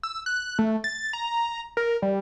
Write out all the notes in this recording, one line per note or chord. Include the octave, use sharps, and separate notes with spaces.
E6
F#6
A3
A6
A#5
A#4
G3